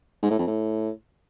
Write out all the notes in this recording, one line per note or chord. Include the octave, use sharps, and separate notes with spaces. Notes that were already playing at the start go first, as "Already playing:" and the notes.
G#2
A2
F2
A2